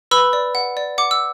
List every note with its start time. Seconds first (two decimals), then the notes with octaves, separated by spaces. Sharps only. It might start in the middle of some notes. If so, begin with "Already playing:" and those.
0.11 B4 B5 E6
0.33 D5
0.55 F#5
0.77 D5
0.98 F#5 D6
1.11 E6